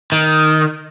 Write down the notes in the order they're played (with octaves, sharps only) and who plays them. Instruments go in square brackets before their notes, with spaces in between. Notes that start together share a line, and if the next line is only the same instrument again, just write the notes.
[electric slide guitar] D#3